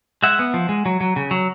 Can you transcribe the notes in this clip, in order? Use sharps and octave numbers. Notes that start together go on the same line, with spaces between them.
G#3 E5 F#5
B3
F3
G#3
F#3
F#3
C#3
F#3